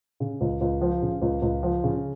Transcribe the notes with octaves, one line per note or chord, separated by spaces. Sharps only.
C#3
C#2
C#2
F3
C#3
C#2
C#2
F3
C#3